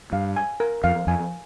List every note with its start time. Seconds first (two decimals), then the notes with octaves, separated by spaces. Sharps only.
0.12 G2 F5
0.36 G#5
0.60 A#4
0.84 F2 F5
1.07 F2 G#5